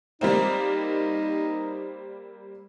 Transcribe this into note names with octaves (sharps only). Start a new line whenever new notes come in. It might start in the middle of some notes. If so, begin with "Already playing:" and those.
G3 A#3 C4 D#4